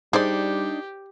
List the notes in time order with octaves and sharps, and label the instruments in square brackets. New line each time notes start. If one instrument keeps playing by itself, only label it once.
[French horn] G3 [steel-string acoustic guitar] D4 D#4 [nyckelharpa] G4 [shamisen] G#4 C5 D5